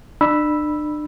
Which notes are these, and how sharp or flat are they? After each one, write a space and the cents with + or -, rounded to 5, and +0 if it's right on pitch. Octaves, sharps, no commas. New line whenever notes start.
D4 +35 B5 -10 E6 +0